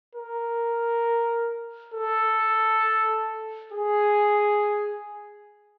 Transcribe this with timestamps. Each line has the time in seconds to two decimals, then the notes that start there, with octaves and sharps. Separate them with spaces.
0.15 A#4
1.94 A4
3.72 G#4